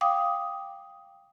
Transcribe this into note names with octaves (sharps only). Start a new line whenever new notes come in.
F5 G5 D6 D#6